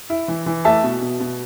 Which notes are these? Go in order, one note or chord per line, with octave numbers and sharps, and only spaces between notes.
E4
E3
E3
A3 E5 A5
B2
B2
B2